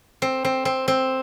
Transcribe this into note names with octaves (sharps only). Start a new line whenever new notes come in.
C4
C4
C4
C4